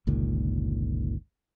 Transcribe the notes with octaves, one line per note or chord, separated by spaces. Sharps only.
G1 C#2 A#2 D#3